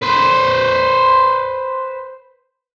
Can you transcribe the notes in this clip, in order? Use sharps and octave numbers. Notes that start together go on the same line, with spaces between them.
B4 C5